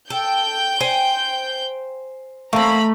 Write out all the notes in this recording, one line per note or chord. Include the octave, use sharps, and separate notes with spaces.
A4 G5 G6
C5 G#5
A3 A#3 C4 A#5 B5